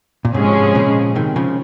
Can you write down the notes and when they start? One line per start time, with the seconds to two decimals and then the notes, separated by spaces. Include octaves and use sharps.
0.25 A#2
0.34 G#2 C3 F3 G#3 C#4 G#4
0.75 A#2 C#3
1.15 C3 D#3
1.36 C#3 F3